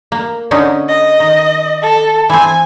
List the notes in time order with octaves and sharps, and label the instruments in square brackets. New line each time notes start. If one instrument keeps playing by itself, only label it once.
[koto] A#3
D3 C#4 D#4
[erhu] D#5
[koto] D#3
[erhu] A4
[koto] E3 C4 [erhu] G#5